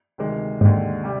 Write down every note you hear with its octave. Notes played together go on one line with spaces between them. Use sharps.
D2 C3 D#3 G#3
D#2 G#2 D3 G#3
C3 G3